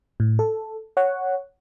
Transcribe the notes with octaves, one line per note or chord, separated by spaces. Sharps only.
A2
A4
C#5 F#5